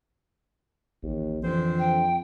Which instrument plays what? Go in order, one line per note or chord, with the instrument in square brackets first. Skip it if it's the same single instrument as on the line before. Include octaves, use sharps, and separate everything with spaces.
[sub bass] A1 [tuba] D#2
[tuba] F2 [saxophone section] D3 C4 C5 [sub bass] E3
[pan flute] G5